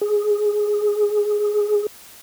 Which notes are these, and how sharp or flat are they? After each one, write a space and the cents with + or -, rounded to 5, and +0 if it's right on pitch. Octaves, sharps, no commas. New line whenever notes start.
G#4 +5